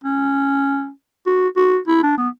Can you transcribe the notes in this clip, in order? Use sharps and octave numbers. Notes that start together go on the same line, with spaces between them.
C#4
F#4
F#4
E4
D4
B3